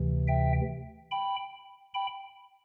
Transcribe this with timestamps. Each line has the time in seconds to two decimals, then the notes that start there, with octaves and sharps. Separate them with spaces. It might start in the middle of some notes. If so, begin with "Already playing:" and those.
Already playing: D2 C3 E3
0.28 E5 G5
1.11 G5 B5
1.94 G5 B5